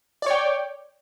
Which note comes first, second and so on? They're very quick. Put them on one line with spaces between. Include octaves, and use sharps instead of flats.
D5 C#5 G5